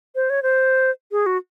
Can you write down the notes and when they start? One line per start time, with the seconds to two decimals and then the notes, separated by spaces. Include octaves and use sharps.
0.15 C5
0.30 C#5
0.43 C5
1.12 G#4
1.26 F#4